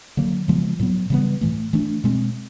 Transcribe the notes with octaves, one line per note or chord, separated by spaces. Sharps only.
D3 F#3 A#3
C#3 F3 G#3 B3
A2 F#3 B3
C#3 E3 G3 B3
A2 E3 A3
E3 A3 D4
B2 G#3 C4